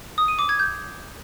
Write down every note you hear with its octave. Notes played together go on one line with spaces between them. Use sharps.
D#6
D#7
D6
G#6
G6